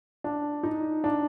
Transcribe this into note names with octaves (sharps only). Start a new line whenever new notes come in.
D4
D#4
D4